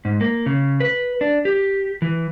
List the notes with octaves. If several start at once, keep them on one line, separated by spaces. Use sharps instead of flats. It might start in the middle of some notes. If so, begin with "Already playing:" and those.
G#2
A#3
C#3
B4
D4
G4
E3